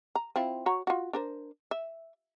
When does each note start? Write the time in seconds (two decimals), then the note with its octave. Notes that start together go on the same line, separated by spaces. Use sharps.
0.15 A#5
0.36 C4 E4 F4
0.66 F#4 C#5 A#5
0.87 F4 F#4
1.13 D4 A#4 C5
1.71 E5